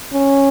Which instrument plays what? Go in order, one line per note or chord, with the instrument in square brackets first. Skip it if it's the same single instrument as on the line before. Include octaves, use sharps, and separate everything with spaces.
[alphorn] C#4